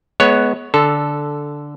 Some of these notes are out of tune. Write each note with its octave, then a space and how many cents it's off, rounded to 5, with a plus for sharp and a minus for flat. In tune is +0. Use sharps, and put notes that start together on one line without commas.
G#3 +25 B3 +0 C#5 +0
D3 +0 A4 -5